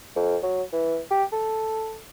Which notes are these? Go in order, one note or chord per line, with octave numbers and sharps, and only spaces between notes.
F2
F#3
E3
G4
A4